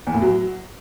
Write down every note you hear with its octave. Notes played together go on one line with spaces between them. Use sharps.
E2
A2
F#3